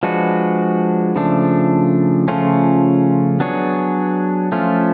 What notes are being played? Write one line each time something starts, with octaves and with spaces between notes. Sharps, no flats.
F3 G#3 D4 F#4 B4
C#3 F3 A3 D4
C#3 F3 A3 C#4 F4
F#3 B3 D4 G#4 C#5
F3 A3 C#4 F4